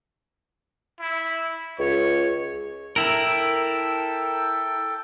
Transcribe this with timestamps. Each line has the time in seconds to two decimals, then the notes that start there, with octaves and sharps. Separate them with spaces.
1.00 E4
1.79 C#2 C#5
2.96 E4 A4 A#4 G5